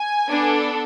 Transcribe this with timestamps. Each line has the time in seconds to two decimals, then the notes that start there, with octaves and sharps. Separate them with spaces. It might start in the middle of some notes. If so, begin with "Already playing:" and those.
Already playing: G#5
0.28 B3 D4 A4